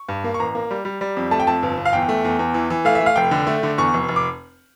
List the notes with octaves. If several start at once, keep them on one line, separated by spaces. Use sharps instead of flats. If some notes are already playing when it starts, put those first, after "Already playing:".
Already playing: C#6
G2
A#3
C#6
A1 A#5
A#3
G3
G3
G3
F2
A3 A5
G5
F2 A5
G1
G1
F5
E2 G5
A3
E2
E2
E3
E3
A3 F5
E5
A3
F5
F1 G5
D3
A3
D3
E2 C#6
F1
F1
D6